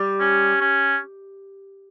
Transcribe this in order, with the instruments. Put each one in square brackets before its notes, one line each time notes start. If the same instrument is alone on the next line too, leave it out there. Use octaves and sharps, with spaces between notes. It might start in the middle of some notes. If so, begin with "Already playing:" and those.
Already playing: [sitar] G3
[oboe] C#4
C#4